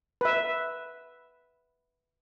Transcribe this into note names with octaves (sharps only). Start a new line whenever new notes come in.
B4 E5